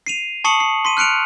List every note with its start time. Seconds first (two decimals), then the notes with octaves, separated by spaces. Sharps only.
0.07 C7 D#7 F7
0.44 A5 C#6 D#6 C7 C#7 F#7
0.60 C7
0.85 C6 B6 D#7
0.97 F6 F#6 C#7 D7 F7